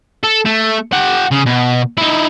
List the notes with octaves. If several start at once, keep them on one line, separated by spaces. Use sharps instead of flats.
A4
A3
G4 F#5
C#3
B2
D#4 E4